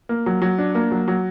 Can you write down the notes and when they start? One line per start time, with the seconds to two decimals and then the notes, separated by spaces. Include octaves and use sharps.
0.09 A#3
0.26 F#3
0.42 F#3
0.58 D4
0.75 A#3
0.91 F#3
1.08 F#3